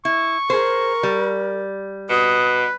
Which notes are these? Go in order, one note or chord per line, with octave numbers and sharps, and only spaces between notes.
E4 C#6
G#4 A#4 C5
G3
B2 B4 D#6